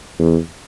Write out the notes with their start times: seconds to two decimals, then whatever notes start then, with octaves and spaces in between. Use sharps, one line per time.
0.19 E2